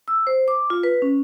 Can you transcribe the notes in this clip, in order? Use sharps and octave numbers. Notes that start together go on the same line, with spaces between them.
E6
C5
D6
F4
B4
C#4